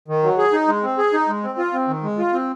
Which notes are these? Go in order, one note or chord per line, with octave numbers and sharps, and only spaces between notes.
D#3
F#3
G#4
D#4
G#3
C4
G#4
D#4
G#3
C4
F4
C4
D#3
G#3
F4
C4